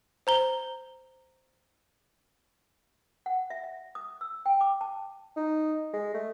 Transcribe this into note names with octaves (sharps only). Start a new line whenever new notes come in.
C5 A#5 G7
F#5
E5
E5
D#6
E6
G5
D6
A5
D#4
G#3
A3